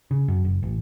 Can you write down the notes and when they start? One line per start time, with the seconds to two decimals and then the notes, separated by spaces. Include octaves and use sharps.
0.11 C#3
0.28 F#2
0.45 F#1
0.63 A1